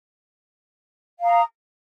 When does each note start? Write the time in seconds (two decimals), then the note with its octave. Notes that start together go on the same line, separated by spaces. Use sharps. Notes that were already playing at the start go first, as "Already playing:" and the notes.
1.19 F5
1.22 A#5
1.25 D#6